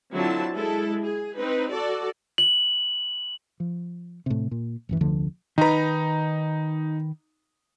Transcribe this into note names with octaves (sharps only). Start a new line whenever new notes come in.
D3 F#3 C4 E4 F4 A5
G#3 E4 A4
G#4
C4 D#4 B4
F#4 A4 D5
F#7
F3
A2 C3
A#2
D1 F#2 E3
F1 D2 D3 F3
D#3 D#4 B4 A#5